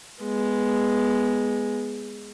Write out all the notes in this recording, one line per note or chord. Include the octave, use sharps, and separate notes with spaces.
G#3 B3